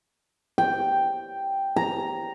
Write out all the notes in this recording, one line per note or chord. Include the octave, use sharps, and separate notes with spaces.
G5
A#5